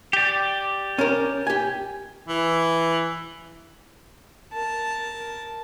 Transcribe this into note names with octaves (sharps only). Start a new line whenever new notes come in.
G4 D5
C#4 A#4
G4 G#5
E3
A#4 A5